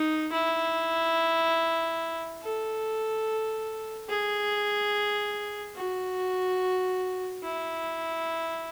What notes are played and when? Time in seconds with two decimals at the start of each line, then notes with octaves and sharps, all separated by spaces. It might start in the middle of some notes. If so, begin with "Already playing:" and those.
Already playing: D#4
0.32 E4
2.41 A4
4.09 G#4
5.75 F#4
7.43 E4